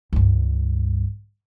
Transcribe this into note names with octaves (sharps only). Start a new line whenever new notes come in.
C#2 G2